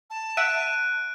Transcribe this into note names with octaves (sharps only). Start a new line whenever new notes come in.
A5
E5 F#5 F#6 D7 D#7